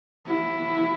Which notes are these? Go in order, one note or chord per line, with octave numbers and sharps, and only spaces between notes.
E4